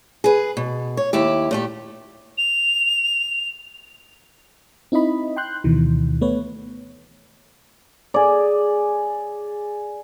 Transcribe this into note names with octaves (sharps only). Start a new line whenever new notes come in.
G#4 B4
B2
C#5
D#2 E4 G4
A#2 A3 G4
F7
C4 D#4 E4 D#5 B5
G5 C6 F#6 G6
D2 B2 D#3 E3
A3 B3 B4 C#5
G#4 D5